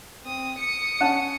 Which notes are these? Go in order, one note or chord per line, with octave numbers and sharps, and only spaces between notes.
C4 D#6
D#6 C#7
C#4 F#5 A5